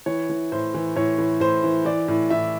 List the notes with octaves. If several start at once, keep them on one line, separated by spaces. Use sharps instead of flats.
E3 C#5
E3
A2 C5
E3
A2 C#5
E3
A2 C5
E3
E3 D5
A2
A2 E5